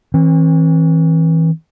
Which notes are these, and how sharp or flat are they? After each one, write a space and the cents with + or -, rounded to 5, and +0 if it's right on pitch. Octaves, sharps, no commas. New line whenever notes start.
E3 -30 C4 +45